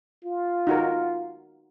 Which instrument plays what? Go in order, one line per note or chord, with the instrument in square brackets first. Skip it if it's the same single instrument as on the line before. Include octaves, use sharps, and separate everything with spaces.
[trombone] F4
[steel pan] D#4 F#4 A#4